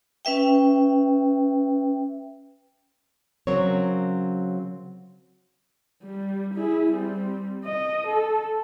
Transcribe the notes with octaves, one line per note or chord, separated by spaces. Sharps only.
C#4 B4 E5 G5
C#3 F#3 C4 A#4 C#5
G3
E4 G#4
G3 C4
D#5
A4